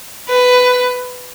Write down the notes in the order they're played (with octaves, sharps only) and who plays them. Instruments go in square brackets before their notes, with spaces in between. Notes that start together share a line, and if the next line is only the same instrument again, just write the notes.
[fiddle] B4